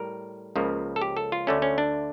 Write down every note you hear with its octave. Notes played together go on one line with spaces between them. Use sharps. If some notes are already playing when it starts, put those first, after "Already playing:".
Already playing: A2 G3 A#4
C#2 C#3 F3 A#3
A4
G4
A4
F4
D2 D3 A3 C#4
C#4
D4